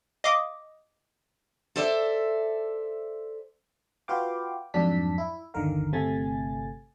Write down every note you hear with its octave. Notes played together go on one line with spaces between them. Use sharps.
D#5 F5 D6 D#6
A4 C5 D5 E5
F4 F#4 B4 F5 G5 D6
F2 G#2 F#3 D4 A5 B6
E4
G1 D#2 D3 D#3 A#4 F5
G1 C3 A3 G#5 A6